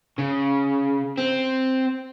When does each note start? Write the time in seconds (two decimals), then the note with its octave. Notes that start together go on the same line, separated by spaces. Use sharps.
0.18 C#3
1.18 C4